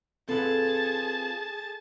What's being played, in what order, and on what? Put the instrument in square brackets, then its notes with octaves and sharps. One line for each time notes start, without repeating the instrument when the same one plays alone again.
[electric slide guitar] C4 F4 B4 [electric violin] G#4 A5 [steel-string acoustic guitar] A4